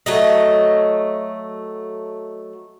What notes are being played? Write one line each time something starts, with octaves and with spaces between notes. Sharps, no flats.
F#3 A3 D#5